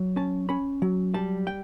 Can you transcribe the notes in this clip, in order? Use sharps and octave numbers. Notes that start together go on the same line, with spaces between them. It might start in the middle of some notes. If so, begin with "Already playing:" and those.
Already playing: F#3
C#4 A5
C#4 B5
F#3
G3 A5
G5